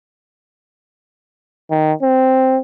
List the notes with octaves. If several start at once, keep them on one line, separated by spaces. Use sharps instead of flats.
D#3
C4